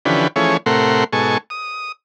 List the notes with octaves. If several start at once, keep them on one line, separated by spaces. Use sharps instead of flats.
D3 E3 F3 C#4 G4 B4
E3 F3 A3 C#4 G#4 C#5
A2 C3 A3 A#4 F#5 C6
G#2 B2 A4 G#5 C#6
D#6